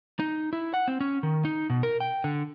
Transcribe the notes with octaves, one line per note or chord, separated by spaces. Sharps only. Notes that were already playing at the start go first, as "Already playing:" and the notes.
D#4
E4
F#5
C4
C#4
D#3
D#4
B2
A#4
G5
D3